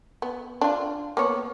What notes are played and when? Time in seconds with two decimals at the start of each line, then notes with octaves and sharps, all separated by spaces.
0.22 B3
0.61 D4 F4
1.17 A#3 B3 C#5